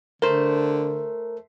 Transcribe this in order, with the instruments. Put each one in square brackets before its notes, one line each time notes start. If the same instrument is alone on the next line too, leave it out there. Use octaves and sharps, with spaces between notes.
[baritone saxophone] D3 [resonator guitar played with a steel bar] A3 C5 [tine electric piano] A#4